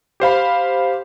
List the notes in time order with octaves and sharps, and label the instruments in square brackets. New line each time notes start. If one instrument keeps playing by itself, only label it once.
[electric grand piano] G4 C5 F5 B5